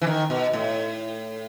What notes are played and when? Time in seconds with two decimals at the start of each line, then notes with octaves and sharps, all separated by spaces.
0.01 E3
0.07 D#3
0.30 B2
0.53 A2